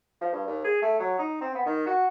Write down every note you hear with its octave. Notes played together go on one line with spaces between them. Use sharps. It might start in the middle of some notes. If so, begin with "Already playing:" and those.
F3
G2
D#2
G#4
A3
F#3
D#4
C4
B3
D#3
F#4